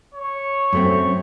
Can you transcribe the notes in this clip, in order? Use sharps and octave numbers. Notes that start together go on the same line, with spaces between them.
C#5
F#2 A3 C4